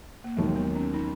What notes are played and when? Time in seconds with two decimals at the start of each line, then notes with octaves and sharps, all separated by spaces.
0.24 A#3
0.37 D#2 D#3 F#3 G#3
0.56 B3
0.76 C#4
0.94 D#4